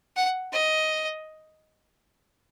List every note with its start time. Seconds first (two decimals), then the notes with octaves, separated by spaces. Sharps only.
0.16 F#5
0.52 D#5